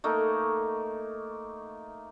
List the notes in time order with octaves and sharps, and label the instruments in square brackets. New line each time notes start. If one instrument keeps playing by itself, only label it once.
[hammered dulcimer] A3 A#3 D#4